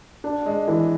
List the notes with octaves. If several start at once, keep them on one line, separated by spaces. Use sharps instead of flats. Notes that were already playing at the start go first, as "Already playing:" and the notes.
D4
G#3
E3